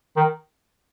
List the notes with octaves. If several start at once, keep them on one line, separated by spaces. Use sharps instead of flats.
D#3